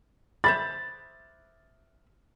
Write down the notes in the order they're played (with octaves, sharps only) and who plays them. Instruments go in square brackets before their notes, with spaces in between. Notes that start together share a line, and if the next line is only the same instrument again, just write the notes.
[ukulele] C5 E5 B5 [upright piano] A6